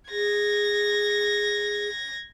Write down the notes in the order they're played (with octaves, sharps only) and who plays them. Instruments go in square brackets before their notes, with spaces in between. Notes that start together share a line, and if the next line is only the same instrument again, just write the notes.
[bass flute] G#4 [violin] G#6 A#6